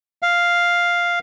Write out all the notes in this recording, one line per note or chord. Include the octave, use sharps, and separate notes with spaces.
F5